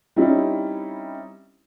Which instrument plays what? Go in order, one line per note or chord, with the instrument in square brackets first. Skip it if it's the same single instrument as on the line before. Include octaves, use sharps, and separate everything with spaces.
[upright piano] G3 C4 C#4 D#4 E4